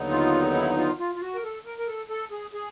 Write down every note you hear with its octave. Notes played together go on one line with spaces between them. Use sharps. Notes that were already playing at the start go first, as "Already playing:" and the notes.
Already playing: D#2 D3 F#3 B3 D#4
F4
E4
F4
F4
F4
F#4
A#4
A4
A#4
A#4
A4
A4
G#4
G#4